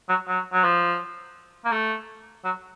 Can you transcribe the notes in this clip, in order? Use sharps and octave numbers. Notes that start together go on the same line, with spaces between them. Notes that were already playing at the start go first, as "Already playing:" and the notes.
F#3
F#3
F#3
F3
A#3
A3
F#3